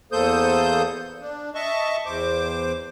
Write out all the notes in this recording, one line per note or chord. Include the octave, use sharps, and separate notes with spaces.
E2 A#3 A4 C5 D#6 G6
D4
D#5 E5 A5 C#6
E2 C5 D6